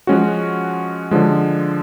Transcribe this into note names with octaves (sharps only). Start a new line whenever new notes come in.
F3 G#3 C#4 F#4
D3 F3 G#3